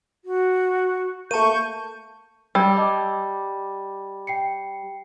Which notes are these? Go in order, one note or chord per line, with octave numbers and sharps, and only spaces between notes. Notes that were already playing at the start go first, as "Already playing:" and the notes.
F#4
A3 A#3 A5 C#6 G6 D#7
G3 G5 E6 G#6
D#5 A5 D6
G5 C7 C#7